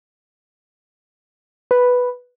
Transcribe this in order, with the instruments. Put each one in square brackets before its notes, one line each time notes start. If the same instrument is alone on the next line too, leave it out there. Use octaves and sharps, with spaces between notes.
[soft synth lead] B4